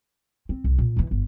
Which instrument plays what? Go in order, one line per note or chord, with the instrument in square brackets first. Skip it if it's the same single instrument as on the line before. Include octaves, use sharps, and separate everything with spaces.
[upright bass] C4
C2
A#2
D#2 E3
G1